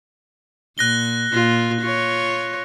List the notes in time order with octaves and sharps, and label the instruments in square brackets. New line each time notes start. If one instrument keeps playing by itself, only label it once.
[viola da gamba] A#2 [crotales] F#6 A#6 G7
[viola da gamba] A#2 F4
F4 C#5